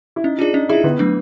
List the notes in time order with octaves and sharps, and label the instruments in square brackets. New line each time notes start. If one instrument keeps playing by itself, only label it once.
[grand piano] E4
[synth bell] C#4 [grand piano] D#4
[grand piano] D4 [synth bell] F4 G#4
[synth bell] C#4 [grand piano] D#4
[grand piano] E4 [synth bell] F4 G#4
[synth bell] D3 [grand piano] B3
[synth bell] F#3 A3 D4